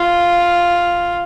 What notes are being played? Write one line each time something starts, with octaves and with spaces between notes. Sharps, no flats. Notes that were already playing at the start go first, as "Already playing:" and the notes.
Already playing: F4